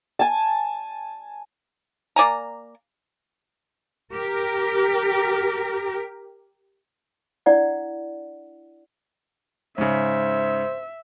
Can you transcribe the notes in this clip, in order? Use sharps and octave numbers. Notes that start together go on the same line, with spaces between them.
G#5 A5
A#3 D5 G#5 A#5
G4 A#4
D4 E4 D5 F#5
G#2 C#3 C5 E5